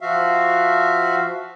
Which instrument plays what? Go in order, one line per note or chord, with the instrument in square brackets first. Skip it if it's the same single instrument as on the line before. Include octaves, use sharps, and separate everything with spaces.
[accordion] F3 F#4 E5 F5